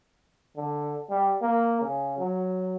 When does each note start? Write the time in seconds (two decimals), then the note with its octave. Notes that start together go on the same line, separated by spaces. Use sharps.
0.57 D3
1.10 G3
1.42 A#3
1.81 C#3
2.18 F#3